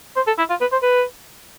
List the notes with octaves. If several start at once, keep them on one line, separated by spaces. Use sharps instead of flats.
C5
A4
E4
F4
B4
C5
B4